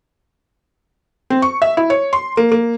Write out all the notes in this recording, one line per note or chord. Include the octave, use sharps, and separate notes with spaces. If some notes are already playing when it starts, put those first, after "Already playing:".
C4
C#6
E5
E4
C#5
C6
A#3
A#3